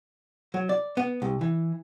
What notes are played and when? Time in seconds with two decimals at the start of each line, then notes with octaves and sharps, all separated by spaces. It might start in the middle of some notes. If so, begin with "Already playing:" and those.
0.54 F#3
0.69 D5
0.97 B3
1.22 C2
1.41 E3